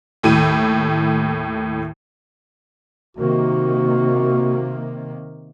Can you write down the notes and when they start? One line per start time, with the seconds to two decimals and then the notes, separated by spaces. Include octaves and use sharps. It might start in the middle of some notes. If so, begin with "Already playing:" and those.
0.23 D#2 A2 E4 D#7
3.17 C3 D#3 A#3 F#4